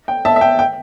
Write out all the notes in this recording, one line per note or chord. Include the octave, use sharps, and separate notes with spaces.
G5
E5 A5
E5
G5
G5